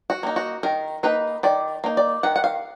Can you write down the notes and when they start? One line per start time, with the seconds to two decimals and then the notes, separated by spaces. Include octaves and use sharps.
0.10 F#4
0.23 A#3 D#4
0.36 F#4
0.63 D#3 A#4
1.03 A#3 D#4 B4
1.43 D#3 D5
1.84 A#3 D#4
1.97 D5
2.23 D#3 F#5
2.36 F#5
2.44 F5